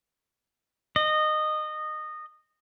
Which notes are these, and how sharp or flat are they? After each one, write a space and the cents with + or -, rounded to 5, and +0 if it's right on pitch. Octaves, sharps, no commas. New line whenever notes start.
D#5 -20